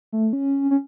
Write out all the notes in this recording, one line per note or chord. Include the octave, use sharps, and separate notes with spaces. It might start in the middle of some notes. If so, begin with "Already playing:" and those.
A3
C#4
C#4